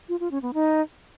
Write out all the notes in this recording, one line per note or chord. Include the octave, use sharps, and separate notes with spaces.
F4
F4
C#4
B3
D#4